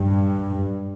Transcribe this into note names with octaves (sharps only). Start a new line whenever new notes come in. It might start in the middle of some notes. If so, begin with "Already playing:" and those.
Already playing: G2